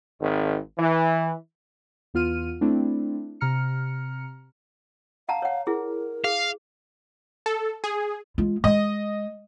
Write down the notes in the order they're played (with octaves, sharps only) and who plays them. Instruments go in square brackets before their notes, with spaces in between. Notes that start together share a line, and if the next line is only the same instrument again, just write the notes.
[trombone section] G#1
E3
[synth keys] E2 B3 F4 F6 D#7
A3 C4 D4 E4
C3 A#5 F6 C#7
[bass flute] F5 [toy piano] F#5 A5 A#5
[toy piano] C#5 F#5
[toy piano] E4 G#4 [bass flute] A#4
[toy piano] G#4 [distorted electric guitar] F5
[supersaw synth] A4
G#4
[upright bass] G#3 F4
[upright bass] G#3 [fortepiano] D#5